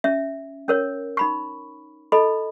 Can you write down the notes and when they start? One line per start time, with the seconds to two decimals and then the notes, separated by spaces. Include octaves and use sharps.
0.04 C#4 E5
0.68 C#4 A#4 C#5
1.17 D#4 B5 C#6
2.12 E4 A4 D#5 B5